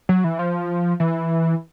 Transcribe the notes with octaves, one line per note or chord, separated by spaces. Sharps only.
F#3
E3
F3
E3